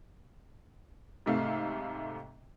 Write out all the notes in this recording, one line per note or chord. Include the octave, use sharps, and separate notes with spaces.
G#2 C3 A3 E5 F5